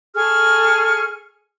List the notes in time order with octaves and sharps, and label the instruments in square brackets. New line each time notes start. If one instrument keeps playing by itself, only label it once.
[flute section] G#4 A4 C#6 F6